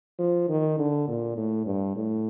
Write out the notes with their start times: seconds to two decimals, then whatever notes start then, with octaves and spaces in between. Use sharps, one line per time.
0.19 F3
0.49 D#3
0.79 D3
1.08 A#2
1.37 A2
1.66 G2
1.95 A2